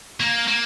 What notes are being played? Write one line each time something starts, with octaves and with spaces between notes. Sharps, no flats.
A#3
A#3